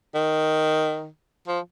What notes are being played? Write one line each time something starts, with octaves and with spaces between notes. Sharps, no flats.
D#3
F3